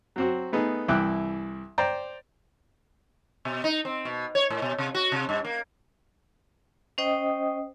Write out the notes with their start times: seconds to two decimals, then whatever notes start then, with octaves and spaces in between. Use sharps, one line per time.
0.16 F#3 C4 F#4
0.52 A3 B3 D#4 G#4
0.88 C2 E3 E4 G5 D6 F#6
1.78 C5 D5 G5 A#5
3.45 B2
3.64 D#4
3.85 C4
4.05 B2
4.35 C#5
4.50 A2
4.62 B2
4.78 C3
4.95 F#4
5.12 C3
5.29 G2
5.45 A#3
6.98 C#4 C5 D#5 G5 D#6